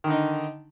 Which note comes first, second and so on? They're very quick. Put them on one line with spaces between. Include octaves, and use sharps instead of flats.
D#3 D3 D#4